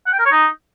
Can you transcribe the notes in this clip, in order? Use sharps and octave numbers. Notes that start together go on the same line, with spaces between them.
F#5
G5
A#4
C#5
D#4